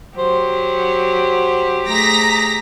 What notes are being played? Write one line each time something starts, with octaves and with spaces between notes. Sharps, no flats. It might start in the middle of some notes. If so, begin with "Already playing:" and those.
F#3 G4 C5
A3 G#4 A#5 A#6 B6